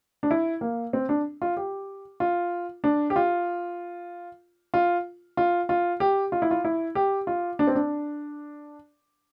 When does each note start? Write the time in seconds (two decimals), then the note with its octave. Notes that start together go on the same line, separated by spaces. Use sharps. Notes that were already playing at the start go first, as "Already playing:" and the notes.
0.23 D4
0.31 E4
0.61 A#3
0.93 C4
1.09 D4
1.42 F4
1.57 G4
2.20 F4
2.84 D4
3.10 G4
3.16 F4
4.74 F4
5.37 F4
5.69 F4
6.00 G4
6.32 F4
6.42 E4
6.51 F4
6.65 E4
6.95 G4
7.27 F4
7.59 D4
7.67 C4
7.75 D4